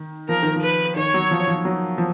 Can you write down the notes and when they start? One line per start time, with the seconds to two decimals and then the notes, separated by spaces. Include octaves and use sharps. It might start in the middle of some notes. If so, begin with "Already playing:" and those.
Already playing: D#3
0.29 F3 A#4
0.43 D#3
0.56 F3
0.62 B4
0.96 D#3 C#5
1.14 F#3
1.31 F3
1.48 F3
1.65 F#3
1.98 F3